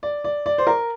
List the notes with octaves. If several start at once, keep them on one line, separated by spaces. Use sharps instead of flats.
D5
D5
D5
C5
A#4